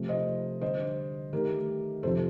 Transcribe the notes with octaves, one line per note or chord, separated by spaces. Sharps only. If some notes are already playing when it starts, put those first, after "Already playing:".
Already playing: C3 F3 A3
C5 D#5
D3 G3 D4 C5 D#5
D#3 A3 D#4 G4 A#4
F2 C3 F3 A4 C5